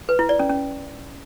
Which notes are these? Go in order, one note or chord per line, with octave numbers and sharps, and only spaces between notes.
B4
E4
D5
C#4
C#4